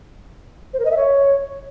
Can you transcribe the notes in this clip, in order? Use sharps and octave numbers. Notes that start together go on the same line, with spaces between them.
C5
A#4
D#5
E5
C#5